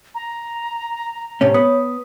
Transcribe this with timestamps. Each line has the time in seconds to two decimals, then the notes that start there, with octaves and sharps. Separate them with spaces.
0.15 A#5
1.41 A2 C3 C#4 C#5
1.54 B3 D#6